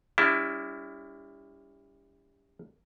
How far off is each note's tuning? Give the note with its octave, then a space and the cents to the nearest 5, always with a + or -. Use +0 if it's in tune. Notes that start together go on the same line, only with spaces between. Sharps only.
G3 +35 C#4 +45 E4 +0